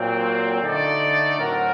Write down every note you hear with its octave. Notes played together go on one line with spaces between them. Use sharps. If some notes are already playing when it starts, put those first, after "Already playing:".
Already playing: A#2 F#3 C4
D3 A3 D#4 A4 D5
A2 F#3 C4 F#4 A#4